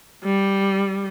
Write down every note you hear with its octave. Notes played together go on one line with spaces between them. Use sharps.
G3